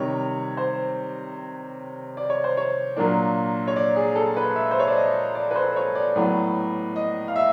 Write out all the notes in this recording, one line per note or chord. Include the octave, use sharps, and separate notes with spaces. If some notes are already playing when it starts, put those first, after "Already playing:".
Already playing: C3 D#3 G3 C#5
C5
D5
C#5
C5
C#5
A#2 F#3 A#3 D4
C#5
D5
G#4
A4
B4
E5
C5
C#5
D5
D#5
D5
B4
C5
C#5
D5
A2 F#3 B3
D#5
F5
E5